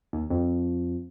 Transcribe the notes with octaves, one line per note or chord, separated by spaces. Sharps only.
D#2
F2